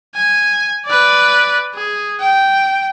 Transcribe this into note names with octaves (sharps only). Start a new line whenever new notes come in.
G#5
B4 D5
G#4
G5